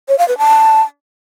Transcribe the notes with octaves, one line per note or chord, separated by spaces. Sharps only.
C#5
F5
B4
A5